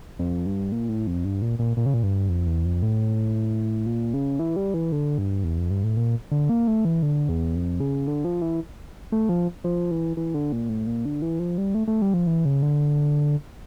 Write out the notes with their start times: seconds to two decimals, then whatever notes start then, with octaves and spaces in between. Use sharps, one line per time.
0.19 F2
0.46 G2
0.72 A#2
0.89 A2
1.07 F2
1.25 G2
1.42 A#2
1.59 A#2
1.77 A#2
1.86 C#3
1.94 A#2
2.03 G2
2.29 F2
2.46 E2
2.65 F2
2.82 A2
3.86 A#2
4.14 C#3
4.39 E3
4.56 G3
4.74 E3
4.92 D3
5.18 G2
5.44 E2
5.58 F2
5.70 G2
5.83 A2
5.97 A#2
6.31 D3
6.49 A#3
6.68 A3
6.85 E3
7.02 D3
7.29 E2
7.55 F2
7.80 C#3
8.08 D3
8.25 F3
8.42 E3
9.12 A3
9.29 F3
9.64 F3
9.91 E3
10.17 E3
10.34 D3
10.52 A#2
10.69 A2
10.87 A#2
11.05 D3
11.22 E3
11.39 F3
11.58 G3
11.75 A3
11.88 A3
12.02 G3
12.14 F3
12.27 E3
12.45 C#3
12.63 D3